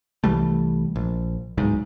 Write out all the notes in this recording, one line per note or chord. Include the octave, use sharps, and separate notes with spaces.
C2 E3 G3 A3
A#1
D1 B1 G#2